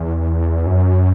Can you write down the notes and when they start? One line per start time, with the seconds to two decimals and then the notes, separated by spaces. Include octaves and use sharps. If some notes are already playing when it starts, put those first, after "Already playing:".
Already playing: E2
0.66 F#2